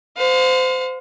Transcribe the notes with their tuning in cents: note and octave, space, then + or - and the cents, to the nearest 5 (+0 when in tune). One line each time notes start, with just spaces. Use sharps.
C5 -25 F5 +35